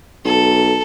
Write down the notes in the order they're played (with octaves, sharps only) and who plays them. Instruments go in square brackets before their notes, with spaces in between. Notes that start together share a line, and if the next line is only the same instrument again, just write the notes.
[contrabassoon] B1 [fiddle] A4